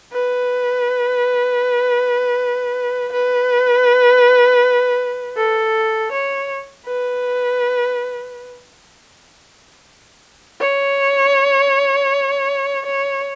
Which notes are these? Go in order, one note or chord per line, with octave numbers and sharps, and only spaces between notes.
B4
B4
A4
C#5
B4
C#5
C#5